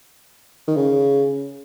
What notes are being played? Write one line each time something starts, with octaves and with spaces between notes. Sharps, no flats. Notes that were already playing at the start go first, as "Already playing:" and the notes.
D#3
C#3